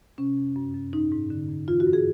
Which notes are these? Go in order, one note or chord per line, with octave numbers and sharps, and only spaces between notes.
C3 C#4
F2
F#2
F#2
G#2 D#4
G#2
D3
F2
E3 F4
F#4
G2
G#4